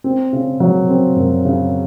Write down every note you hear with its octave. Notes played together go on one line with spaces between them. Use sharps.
C4
C#3
F#3
C4
F#2
C#3